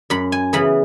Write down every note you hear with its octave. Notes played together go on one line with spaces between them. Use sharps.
F#2 B5
G#5
C#3 E3 B3 B5